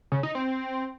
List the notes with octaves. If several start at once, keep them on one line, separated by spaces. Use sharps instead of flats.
C#3
D#4
C4